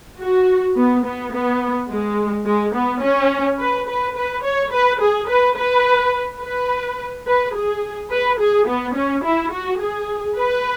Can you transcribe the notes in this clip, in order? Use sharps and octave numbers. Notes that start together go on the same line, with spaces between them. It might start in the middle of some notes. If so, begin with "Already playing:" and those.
F#4
B3
B3
B3
G#3
G#3
B3
C#4
B4
B4
B4
C#5
B4
G#4
B4
B4
B4
B4
G#4
B4
G#4
B3
C#4
E4
F#4
G#4
B4